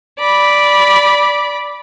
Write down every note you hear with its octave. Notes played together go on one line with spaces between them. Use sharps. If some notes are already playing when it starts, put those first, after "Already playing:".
D5 B5